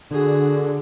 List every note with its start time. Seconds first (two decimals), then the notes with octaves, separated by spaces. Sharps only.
0.11 D3 F#4 G#4